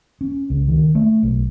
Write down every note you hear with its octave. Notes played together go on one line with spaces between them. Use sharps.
C#4
C#2
D#3
A3
B1